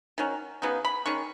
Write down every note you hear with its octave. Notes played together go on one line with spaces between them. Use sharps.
D#3 F#3 C#4
C#3 F#3 B3 D#4
B5
D#3 G#3 C#4 C#6